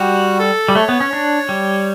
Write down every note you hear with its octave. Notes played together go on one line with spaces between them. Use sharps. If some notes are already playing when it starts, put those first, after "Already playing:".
Already playing: G3 F#4
A4
G3
A3 C#5
B3
C#4
D4
G3